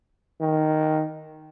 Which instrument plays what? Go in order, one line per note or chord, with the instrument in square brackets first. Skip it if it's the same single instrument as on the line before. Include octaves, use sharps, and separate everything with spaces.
[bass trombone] D#3